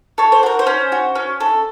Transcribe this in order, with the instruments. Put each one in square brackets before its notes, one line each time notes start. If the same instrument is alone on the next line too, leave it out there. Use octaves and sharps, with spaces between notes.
[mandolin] A4 C#5
C5
F#4 A#4
C5
C#4
F#4
C#4
A4